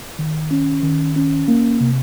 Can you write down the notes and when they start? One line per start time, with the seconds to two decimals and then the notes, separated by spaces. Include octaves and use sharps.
0.19 D#3
0.51 C#4
0.83 D#3
1.16 C#4
1.48 A#3
1.81 C3